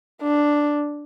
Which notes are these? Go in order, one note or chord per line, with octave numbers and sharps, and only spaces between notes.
D4